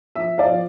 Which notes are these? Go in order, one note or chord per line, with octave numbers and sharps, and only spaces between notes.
F3 E5
D5 F5
F3